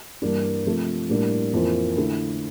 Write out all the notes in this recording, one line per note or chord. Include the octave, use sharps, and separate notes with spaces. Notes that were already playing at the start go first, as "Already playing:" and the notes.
G2 E3 A#3 D4
C3 F3 A3
A2 G3 A#3 D4
F2 E3 A#3 F4 C5
D3 A3 E4